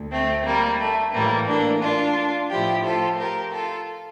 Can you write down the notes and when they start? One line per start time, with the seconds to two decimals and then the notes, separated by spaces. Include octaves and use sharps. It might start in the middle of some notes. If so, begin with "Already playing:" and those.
Already playing: D2
0.11 A3 C4
0.45 G3 A#3
0.79 A3
1.13 A2 E3 G3 A#3
1.48 A#3 D4
1.82 D4 F4
2.50 A2 F3 E4 G4
2.85 F4 A4
3.19 G4 A#4
3.53 F4 A4